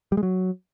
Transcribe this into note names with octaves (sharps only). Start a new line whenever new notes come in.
G3
G#3
F#3